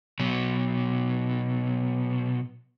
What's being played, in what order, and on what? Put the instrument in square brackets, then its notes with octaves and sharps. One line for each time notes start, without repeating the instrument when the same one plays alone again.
[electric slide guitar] B2 F#3